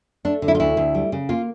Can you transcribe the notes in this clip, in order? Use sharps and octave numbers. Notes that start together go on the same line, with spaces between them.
A3 D4
D3
E4
F4
D2 E4
D2
G3
C#3
A#3 F4